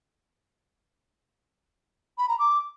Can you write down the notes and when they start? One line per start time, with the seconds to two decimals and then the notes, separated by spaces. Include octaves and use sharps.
2.18 B5
2.29 A#5
2.39 D6